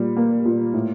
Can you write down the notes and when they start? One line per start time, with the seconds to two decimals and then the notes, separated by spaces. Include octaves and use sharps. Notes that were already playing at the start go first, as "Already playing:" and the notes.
Already playing: A#2 G3
0.17 A#3
0.45 A#2
0.74 A2